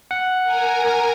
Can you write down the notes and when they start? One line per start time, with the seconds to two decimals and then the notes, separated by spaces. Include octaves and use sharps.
0.11 F#5
0.43 A#4 G#5 A#5